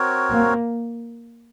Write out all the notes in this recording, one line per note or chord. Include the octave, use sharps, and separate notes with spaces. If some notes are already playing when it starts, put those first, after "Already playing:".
Already playing: C4 F#4 A#4 C#5
A#3